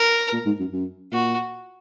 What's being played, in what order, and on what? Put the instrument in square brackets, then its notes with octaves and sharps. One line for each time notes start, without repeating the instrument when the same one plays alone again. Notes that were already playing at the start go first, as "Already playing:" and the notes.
Already playing: [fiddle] A#4
[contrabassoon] A#2
G#2
F#2
F#2
[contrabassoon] A#2 [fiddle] F#4